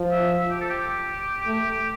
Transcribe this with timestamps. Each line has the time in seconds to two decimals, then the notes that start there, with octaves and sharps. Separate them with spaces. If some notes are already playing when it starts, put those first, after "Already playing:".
Already playing: F3
0.11 E5
0.50 G4
0.61 A4
0.70 G4
1.46 A3